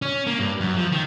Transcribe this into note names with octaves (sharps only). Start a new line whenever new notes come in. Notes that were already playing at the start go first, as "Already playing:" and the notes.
C#4
A#3
G2
F#2
F3
D#3